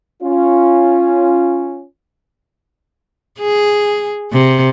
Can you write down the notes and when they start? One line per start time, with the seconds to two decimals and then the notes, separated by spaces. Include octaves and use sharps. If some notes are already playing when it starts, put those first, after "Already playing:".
0.23 C#4 F4
3.39 G#4
4.32 C3